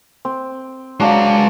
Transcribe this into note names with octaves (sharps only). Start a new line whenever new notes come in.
C4
F#3 G#3 D4 F5 A#5